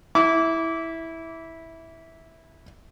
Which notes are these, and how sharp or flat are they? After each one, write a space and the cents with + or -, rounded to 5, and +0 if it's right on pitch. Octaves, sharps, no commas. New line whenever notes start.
E4 -10 D6 -25